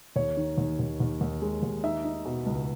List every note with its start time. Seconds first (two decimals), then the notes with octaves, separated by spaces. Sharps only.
0.16 D#2 C#5
0.37 D#3
0.58 D#2
0.79 D#2
1.00 D#2
1.21 D#2
1.42 G#3
1.63 D#2
1.83 D#4 E5
2.05 D#4
2.25 B2
2.46 C#2